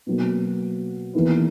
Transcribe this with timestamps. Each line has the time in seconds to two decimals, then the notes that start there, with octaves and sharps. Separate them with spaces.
0.07 B2 F#3 A#3
1.14 E2 D#3 A#3 E4 B4